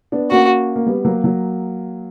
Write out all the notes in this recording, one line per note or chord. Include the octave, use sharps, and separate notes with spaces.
B3 D4
A#3 C#4 F#4
A#3
G3 B3
F#3 A#3
F#3 A#3